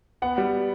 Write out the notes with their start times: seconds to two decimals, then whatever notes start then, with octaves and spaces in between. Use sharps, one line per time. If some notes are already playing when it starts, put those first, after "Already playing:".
0.22 B3 F#5
0.38 G3